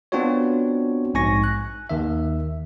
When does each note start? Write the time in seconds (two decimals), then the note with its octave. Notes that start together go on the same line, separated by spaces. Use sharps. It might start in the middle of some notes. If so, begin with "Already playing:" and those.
0.12 B3 C4 D4 F4 F#4 C#5
1.14 A#1 G#2 G#5 C#6 A#6
1.44 F#6
1.90 D#2 D#3 E5